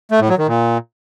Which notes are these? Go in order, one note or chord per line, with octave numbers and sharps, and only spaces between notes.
A3
A2
F#3
D#3
A#2